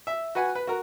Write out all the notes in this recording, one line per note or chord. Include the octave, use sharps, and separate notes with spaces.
E5
F#4 B4 F#5 G#5
B4
F#4 A#4